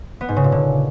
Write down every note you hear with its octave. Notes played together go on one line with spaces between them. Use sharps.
B3
G#2
C#3
A#2
D3